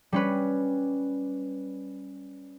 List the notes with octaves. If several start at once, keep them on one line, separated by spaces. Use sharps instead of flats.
G3 C#4 B4